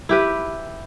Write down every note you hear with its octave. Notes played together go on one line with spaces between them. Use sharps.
E4 G4 B4